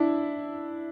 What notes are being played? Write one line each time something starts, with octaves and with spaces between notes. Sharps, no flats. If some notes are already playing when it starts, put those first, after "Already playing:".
Already playing: D4 E4